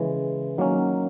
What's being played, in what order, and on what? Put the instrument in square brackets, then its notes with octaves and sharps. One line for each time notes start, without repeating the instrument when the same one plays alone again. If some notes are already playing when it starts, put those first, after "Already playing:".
Already playing: [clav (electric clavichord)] C#3 E3 G#3
D#3 F#3 A#3 C#4